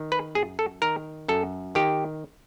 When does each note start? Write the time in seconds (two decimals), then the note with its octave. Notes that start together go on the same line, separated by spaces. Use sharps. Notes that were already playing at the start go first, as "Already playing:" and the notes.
Already playing: D#3
0.12 B4
0.35 F#2 G#4
0.59 A4
0.82 D#3 A#4
1.28 F#2 A4
1.75 D#3 G4